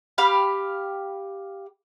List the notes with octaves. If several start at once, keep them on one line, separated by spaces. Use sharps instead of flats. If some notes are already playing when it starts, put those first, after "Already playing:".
G4 F5 B5